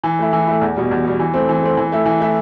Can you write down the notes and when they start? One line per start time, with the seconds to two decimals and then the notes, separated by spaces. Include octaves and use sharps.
0.04 E3
0.19 A3 E4
0.33 E3
0.47 A3 E4
0.61 E2
0.76 B2 G3
0.91 E2
1.04 B2 G3
1.20 E3
1.34 A3 C4
1.49 E3
1.63 A3 C4
1.77 E3
1.92 A3 E4
2.06 E3
2.20 A3 E4